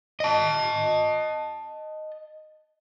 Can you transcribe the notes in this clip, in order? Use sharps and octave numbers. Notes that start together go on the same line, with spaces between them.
D#5 A5